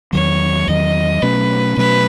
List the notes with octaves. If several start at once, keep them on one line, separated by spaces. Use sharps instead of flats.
E2 D#3 F#3 C#5
E2 D#3 F#3 D#5
B2 F#3 A3 C#4 B4
B2 F#3 A3 C#4 B4